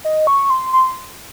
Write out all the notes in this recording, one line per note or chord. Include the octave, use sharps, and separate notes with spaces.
D#5
C#6
C6
C6